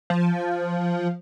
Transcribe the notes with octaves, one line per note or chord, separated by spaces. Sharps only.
F3